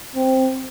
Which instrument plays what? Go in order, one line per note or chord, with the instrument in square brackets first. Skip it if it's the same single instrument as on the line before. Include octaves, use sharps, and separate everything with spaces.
[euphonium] C4